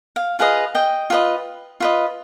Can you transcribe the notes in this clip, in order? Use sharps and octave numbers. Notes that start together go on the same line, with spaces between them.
F5
F4 G#4 B4 D#5 F5
D#5 G5
F4 B4 D#5
F4 B4 D#5